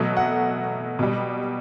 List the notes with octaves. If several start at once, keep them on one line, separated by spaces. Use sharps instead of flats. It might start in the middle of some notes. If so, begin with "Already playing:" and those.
Already playing: B2 F#3 A3
F#5
B2 G3